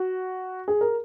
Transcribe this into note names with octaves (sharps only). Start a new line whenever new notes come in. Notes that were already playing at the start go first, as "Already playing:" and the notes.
Already playing: F#4
G#4
A#4